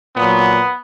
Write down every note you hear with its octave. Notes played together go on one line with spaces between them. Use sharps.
A#2 F#3 B3